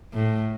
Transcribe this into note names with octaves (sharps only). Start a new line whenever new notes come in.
A2